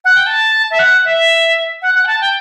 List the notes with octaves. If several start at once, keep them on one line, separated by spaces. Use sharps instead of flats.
F#5
G5
A5
E5
F#5
E5
F#5
F#5
G5
A5
G5